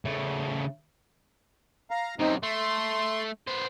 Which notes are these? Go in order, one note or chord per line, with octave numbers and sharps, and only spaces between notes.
C#3 A3
F5 A#5
F#2 C3 C4 D#4
A3 C6
B3 C5